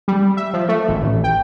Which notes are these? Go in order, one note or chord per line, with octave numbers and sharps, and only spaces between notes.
G3
E5
F3
A3
G#1
A1
G5